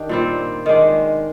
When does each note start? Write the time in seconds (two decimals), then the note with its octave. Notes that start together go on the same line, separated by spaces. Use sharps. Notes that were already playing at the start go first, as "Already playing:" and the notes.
Already playing: D#3 D4 G4
0.09 A#2 G3 C4
0.66 D#3 G#3 D4